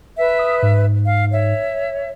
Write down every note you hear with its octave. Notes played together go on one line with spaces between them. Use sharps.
B4 E5
D#6
G#2
F5
C#5 E5